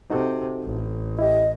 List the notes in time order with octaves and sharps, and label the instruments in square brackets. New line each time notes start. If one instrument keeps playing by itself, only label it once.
[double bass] C3 [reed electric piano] D#4 F#4 A4
[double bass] A1
[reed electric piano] E4 G4 [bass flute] D#5